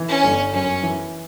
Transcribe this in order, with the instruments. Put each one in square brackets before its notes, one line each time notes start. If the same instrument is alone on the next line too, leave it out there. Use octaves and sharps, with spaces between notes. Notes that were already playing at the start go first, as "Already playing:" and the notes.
Already playing: [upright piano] E3
[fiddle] C#4
[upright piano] G1
[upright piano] F#2 [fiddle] C#4
[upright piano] E3